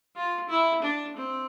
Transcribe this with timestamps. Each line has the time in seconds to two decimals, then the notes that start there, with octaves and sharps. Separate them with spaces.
0.15 F4
0.49 E4
0.82 D4
1.16 C4